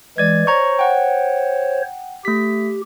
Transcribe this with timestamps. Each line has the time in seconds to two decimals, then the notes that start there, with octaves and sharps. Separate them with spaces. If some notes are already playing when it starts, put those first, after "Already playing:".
0.18 E3 G#3 D5 G#6
0.47 C5 C#5 A#5 C#6
0.79 F#5 G5
2.25 A3 G4 B6